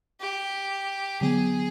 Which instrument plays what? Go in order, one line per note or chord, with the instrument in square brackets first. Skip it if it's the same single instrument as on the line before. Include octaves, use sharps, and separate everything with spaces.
[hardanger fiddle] G4
[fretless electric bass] D3 F#3 B3 [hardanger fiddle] G#4